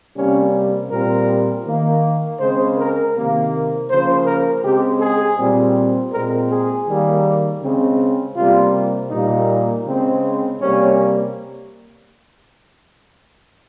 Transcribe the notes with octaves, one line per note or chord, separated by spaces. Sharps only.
C3 G3 A#3 C#4
A#2 G3 C4 A#4
D#3 A#3
C#3 G#3 C4 C5
A#4
C3 D#3 A#3
C#3 F3 A#3 C5
A#4
C#3 G#3 C4 G4
G#4
A#2 G3 C4
A#2 G#3 C4 A#4
G#4
D#3 G3 A#3
C#3 G#3 C4
C3 G3 A#3 F4
A#2 G3 A#3 D#4
C#3 G#3 C4
C3 G3 A#3 C#4